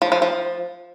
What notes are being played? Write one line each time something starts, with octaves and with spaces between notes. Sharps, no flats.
F3
F3
F3